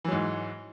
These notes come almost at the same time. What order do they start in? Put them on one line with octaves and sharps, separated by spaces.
E3 F#3 G#2